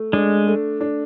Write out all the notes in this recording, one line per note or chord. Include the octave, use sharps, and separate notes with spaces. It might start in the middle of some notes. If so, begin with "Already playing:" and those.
Already playing: A3
G#3 D4
A3
D4